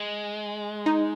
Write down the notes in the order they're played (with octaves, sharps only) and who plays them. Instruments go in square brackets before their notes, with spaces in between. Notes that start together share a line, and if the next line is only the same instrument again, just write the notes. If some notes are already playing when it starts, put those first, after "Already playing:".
Already playing: [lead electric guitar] G#3
[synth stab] D#4